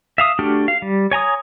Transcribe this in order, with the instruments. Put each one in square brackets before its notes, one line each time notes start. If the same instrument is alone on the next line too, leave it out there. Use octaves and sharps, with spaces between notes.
[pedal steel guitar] E5 F5 D#6
A3 D4 F#4 G4 F6
F5
G3
C#5 G#5 A#5 D#6